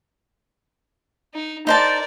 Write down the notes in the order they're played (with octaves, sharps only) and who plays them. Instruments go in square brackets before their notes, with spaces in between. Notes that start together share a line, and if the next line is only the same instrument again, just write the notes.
[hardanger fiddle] D#4
[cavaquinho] D#4 C5 A5 [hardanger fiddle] A#4 D5